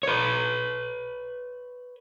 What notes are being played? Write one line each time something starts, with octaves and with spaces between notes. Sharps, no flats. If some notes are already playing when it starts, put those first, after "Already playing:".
B4 C#5